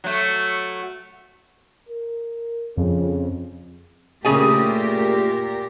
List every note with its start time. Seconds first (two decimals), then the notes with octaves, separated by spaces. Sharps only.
0.04 F#3 A3
1.89 A#4
2.77 F2 C#3
4.25 A#2 C#3 A3 G4 G#4 A#4 G#5